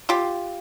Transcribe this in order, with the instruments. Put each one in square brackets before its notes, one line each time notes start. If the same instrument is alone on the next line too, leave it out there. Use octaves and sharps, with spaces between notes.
[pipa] F4 G4